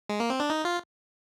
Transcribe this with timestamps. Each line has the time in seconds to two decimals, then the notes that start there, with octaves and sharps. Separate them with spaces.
0.09 G#3
0.20 A#3
0.30 C4
0.40 D4
0.50 D#4
0.65 F4